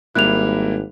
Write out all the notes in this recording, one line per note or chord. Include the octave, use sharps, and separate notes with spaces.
G#1 G3 A#3 E4 F#6 F7